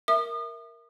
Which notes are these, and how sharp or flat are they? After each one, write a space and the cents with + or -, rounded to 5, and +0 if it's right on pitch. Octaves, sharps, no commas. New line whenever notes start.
A#4 +0 E5 +0 D#6 -40